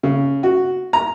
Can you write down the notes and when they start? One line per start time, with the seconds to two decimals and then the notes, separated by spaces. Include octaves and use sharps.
0.03 C#3
0.43 F#4
0.93 A#5